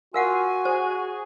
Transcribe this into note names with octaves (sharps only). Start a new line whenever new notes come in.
F4 F#4 A#4 F5 F#5 G#5
G#4 C5